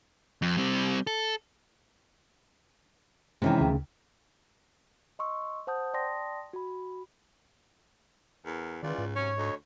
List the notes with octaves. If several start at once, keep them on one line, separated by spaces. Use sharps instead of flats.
F2
G3 C4
A4
C3 D#3 E3 G#3 C#4 E4
D2 C#3
D#5 C6 C#6 E6
C5 F#5 A5 D#6 G6
D5 G5 A5 C6 D#6 A#6
F#4 B5
E2 A#4
C#2 D#3 E3 F4 D5
G#2
C3 F#3 C#4 C#5
D2 D#5